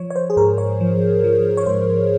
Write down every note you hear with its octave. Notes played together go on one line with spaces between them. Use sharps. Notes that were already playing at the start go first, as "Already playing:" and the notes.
Already playing: F3 C#5
C#5
C5
G#4
G#2 A#4
C#5
F3
F3
C#5
G#2 C5